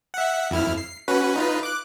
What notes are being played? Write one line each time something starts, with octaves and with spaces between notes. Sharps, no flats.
E5 F#5
F2 E4 F6
C7
C#4 F#4 B4
D#4 F4 B4
D6 F#6